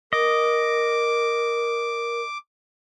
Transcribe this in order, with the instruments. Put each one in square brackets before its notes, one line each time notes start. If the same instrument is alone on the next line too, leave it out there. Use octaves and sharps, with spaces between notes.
[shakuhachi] A#4 [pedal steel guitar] D#5 [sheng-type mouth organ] D6